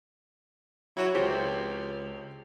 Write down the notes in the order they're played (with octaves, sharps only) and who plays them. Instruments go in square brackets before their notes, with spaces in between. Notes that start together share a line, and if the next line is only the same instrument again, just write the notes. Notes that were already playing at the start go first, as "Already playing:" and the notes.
[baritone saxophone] F#3 [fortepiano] E4 F#4 C#5
[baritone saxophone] C#2 [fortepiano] F3 C4 G4